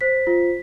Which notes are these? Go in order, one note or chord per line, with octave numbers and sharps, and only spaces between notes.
C5 B6
F4